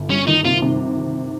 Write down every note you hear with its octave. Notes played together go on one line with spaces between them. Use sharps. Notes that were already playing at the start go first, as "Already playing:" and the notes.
Already playing: G1
G3 C#4
D#3 D#4
C3 F4
C3